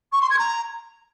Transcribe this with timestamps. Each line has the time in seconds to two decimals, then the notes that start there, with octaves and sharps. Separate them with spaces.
0.12 C#6
0.21 C6
0.30 G#6
0.39 A#5